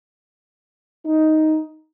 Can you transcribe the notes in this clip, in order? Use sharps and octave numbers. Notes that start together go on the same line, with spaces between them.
D#4